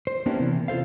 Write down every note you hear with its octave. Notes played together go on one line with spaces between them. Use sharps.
C5
A#3 B3 C#4 D4 E4 G4
C3 E3
F4 A4 C5 F5